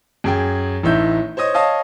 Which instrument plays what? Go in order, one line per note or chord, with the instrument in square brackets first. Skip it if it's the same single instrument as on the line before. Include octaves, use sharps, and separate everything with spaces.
[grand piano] F#2 G#4 G5
A1 A2 D#4 E5 G6
C5 C#5 D#5 D#6
C#5 D#5 F5 A5 D#6